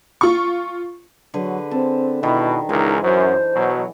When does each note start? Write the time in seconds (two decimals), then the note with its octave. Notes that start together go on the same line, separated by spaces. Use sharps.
0.21 F4 C#6
1.34 D3 F#3 G#4 B4
1.71 C4 A4
2.23 B2 D#3 E4
2.69 C#2 E3 G#3 D#4 A#4
3.03 F#2 C5
3.55 B2 F#3